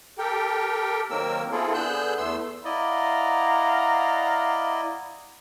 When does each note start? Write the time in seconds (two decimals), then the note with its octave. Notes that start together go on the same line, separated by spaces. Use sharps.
0.18 G4 A4 A#4 G5
1.10 D#3 F#3 A#3 C4 A#4 E6
1.51 B3 C4 E4 F4 G#4 A4
1.74 D3 B3 G#4 E6 F#6 G6
2.17 E2 A3 B3 C6 E6
2.65 E4 D5 D#5 F5 F#5 A#5